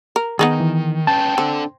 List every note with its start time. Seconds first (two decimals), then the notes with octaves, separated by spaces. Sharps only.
0.16 A#4
0.39 D#3 B3 D#4 G#4
0.60 E3
1.07 C#4 B4 G5 A5
1.38 C4 D4 A4